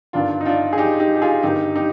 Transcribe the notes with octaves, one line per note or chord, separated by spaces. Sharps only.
G1 G2 D#3 D4 F4
D#4
D4 F4
G#4
D#4 G4
D#4 G4
G4
F4 G#4
G1 G2 D#3 D#4 G4
D#4 G4